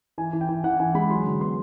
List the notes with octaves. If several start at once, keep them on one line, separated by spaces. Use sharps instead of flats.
E3 G#5
E3
G5
E3
E3 F#5
E3 G#5
G#3 B5
F#3 C6
D3
B3 C6